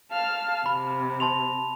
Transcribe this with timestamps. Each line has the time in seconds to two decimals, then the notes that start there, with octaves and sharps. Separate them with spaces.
0.11 F5 A5 F6
0.66 C3 B5
1.20 A5 C6 F7